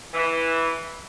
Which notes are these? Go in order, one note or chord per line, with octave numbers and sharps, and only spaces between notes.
E3